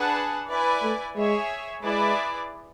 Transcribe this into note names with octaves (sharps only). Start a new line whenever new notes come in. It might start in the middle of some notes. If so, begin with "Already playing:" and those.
Already playing: D4 G#4 B4 F#5 A5
E4 B4 D5 G#5
A3
G#3 G#4 C#5 E5
G#3 E4 G#4 B4 D5